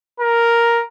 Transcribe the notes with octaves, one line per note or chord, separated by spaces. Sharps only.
A#4